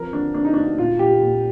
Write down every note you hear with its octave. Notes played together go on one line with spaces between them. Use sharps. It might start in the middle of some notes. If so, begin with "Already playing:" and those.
Already playing: F2 F3 A#4
D3 D4
A#3 D4
D#4
D2 D4
A#2 F4
A#2 G4
A#2